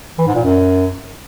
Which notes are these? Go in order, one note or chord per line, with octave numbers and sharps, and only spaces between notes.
E3
G#2
A#2
F#2